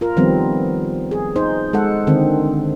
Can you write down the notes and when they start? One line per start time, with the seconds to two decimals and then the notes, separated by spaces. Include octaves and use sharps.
0.01 F4 A#4
0.16 D#3 F3 G3 B3 C4
1.11 G#4
1.36 D#4 C5
1.73 G#3 A4 F#5
2.07 D3 D#3 C4